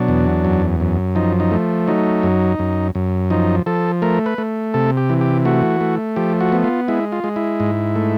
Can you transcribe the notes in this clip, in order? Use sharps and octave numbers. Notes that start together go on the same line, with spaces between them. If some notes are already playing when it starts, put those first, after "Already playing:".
Already playing: B2 F#3 D4
E2
F#2
F#2
F3 D#4
D#4
A3
F#3 D#4
F#2
F#2
F#2
F3 D#4
F3 A4
A3 A#4
B4
A3
C3 A4
G4
E3
G4
A3 F#4
A3
F3 G4
F#4
B3
F4
G#3 E4
F4
G#3
E4
G#2
A3